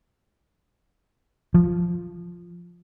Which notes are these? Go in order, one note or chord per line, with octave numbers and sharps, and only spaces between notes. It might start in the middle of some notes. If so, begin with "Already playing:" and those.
F3